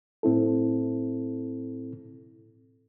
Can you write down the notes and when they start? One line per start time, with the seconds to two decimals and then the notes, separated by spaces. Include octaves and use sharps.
0.23 A2 C4 E4 A4